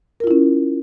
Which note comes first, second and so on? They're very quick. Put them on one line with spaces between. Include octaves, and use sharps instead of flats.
A#4 F4 E4 C#4